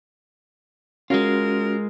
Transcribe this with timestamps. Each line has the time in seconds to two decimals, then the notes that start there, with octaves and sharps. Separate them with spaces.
1.10 G#3 C#4 F4 F#4 A#4